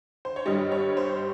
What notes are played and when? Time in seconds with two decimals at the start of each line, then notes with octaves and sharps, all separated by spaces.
0.25 C5
0.36 C#5
0.46 G2 G3 D#5
0.72 C#5
0.97 C5